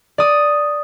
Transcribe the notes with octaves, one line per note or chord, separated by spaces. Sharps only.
D5 D#6